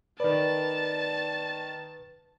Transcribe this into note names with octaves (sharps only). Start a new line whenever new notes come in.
D#3 B4 D5 A5